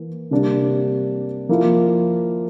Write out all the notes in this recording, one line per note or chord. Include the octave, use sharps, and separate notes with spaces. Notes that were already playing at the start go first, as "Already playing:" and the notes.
Already playing: E3 A#3
C3 G3 A#3 D4
F3 A#3 E4